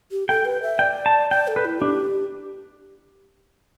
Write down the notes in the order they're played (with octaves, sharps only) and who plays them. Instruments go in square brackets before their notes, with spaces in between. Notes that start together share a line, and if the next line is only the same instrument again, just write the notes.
[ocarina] G4
[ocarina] A4 [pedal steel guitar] G5
[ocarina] B4
E5
[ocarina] D5 [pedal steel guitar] G5
[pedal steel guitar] A5
[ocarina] D5 [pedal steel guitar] G5
[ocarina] A4
[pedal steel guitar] B4
[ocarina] E4
[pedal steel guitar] D4 [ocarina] G4